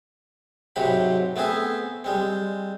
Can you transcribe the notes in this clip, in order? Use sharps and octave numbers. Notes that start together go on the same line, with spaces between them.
G#2 C3 F#3 C4 B5
A3 B3 C4 G#4 E5
G3 G#3 C4